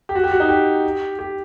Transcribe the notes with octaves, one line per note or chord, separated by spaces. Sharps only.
G4
F#4
G4
F#4
D#4
G4
G4